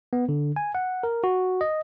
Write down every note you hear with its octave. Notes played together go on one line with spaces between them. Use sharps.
B3
D3
G#5
F#5
A#4
F#4
D#5